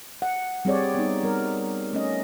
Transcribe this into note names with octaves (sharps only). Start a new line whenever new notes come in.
F#5
G3 C4 G#4 C#5 D5
B3 D#4
G3 A#4
A3 C#4 D#5